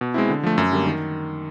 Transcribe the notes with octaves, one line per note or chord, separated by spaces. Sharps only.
B2
G#3 C4 E4
D3
F3 A3
F#2
D3 G3 A#3
D#3